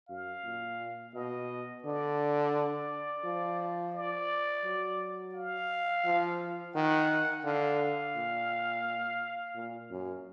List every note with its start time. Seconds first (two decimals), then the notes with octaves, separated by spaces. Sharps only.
0.09 F#2 F5
0.44 A#2
1.14 B2 D#5
1.84 D3 D5
3.24 F3
3.94 D5
4.64 F#3
5.34 F5
6.05 F3
6.75 D#3 F#5
7.44 D3 F5
8.16 A#2
9.55 A#2
9.90 F#2